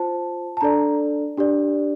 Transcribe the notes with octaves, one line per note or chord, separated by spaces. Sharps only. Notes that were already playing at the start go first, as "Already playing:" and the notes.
Already playing: F4 C5 A5
A5
D4 A4 D5 A#5
D4 G4 D5